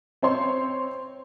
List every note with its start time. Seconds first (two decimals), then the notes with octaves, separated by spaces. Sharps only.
0.22 C4 C5 C#5 C6